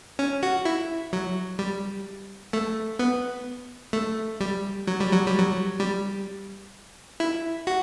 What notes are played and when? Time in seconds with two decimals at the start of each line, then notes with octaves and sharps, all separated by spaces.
0.19 C#4
0.43 F#4
0.65 E4
1.13 F#3
1.59 G3
2.53 A3
2.99 B3
3.93 A3
4.41 G3
4.87 F#3
5.00 G3
5.13 F#3
5.27 G3
5.40 F#3
5.80 G3
7.20 E4
7.67 F#4